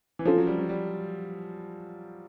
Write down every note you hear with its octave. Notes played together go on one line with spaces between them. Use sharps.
E3
F3 C#4 F4 A4 C5
F#3
G3
F#3
G3